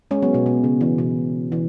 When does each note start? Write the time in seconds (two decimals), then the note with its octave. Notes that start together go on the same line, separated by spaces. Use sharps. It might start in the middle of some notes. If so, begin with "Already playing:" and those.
0.11 G#3 C#4
0.22 F#3 B3
0.34 B2
0.46 B2
0.64 C#3
0.81 E3
0.98 B2
1.52 E3